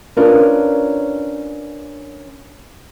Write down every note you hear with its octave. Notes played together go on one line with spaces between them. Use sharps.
C#4 D4 F4 A#4 B4